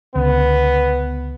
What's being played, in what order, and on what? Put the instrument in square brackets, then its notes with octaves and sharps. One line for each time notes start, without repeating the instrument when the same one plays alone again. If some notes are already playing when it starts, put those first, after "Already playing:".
[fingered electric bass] C#2 D3 [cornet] B3